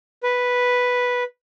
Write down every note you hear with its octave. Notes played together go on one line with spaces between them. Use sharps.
B4